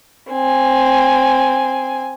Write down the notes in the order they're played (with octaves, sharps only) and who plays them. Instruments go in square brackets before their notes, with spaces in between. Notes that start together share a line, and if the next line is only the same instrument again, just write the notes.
[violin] C4 G#5